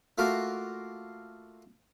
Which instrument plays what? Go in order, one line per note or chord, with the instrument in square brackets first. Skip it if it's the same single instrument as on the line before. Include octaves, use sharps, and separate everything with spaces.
[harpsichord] A3 A#3 F4 F#4 A#4